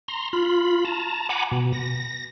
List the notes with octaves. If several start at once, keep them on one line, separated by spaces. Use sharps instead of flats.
A#5 C6
F4 B5
A5 A#5
F#5 G#5 A#5 B5 D6
B2
A#6